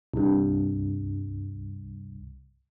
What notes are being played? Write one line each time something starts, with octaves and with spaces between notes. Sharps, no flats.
C2 G2